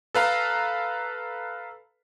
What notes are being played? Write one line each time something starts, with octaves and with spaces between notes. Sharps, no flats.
A4 B4 F5 A#5